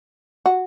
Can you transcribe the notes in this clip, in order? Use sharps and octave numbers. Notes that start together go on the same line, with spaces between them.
F#4